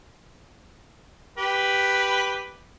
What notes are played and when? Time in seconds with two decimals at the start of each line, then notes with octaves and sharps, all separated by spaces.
1.38 G4 B4